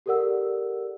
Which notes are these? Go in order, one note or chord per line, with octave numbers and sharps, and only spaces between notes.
G4 A4 A#4 D5 F#5 E6